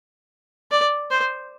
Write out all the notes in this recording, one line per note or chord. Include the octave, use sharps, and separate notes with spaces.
D5
C5